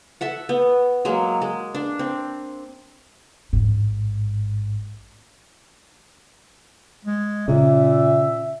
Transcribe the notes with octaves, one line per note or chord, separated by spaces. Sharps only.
A4 E5 F#5
B3
F#3 G#3 A#3
G#3
D4
C4
A1 G#2
G#3
A#2 C#3 E5